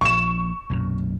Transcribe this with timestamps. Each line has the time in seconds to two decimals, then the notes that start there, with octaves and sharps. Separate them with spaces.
0.01 A#1 D3 F3 C#6 E7
0.70 B1 F#2 A#2